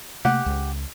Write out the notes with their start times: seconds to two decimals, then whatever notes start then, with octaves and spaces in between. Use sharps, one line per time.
0.25 C3 A3 A#3 G4 F#5
0.46 C#2